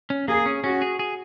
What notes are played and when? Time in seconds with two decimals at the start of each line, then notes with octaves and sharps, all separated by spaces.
0.10 C#4
0.28 A#3 G#4
0.46 C#4
0.64 C#4 F#4
0.82 G#4
0.99 G#4